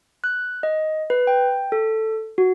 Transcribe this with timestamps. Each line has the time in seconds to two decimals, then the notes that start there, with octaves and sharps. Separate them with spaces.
0.24 F#6
0.63 D#5
1.10 B4
1.27 G5
1.72 A4
2.38 F#4